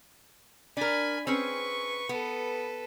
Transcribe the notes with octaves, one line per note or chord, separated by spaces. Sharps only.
D4 A#4 G#5 B5
C4 C#4 G#4 B4 C#6
B3 A4 B4